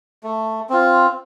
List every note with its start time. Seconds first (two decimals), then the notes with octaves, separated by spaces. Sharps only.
0.23 A3
0.69 C4 F4